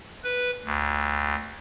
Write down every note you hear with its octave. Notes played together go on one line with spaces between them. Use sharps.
B4
D2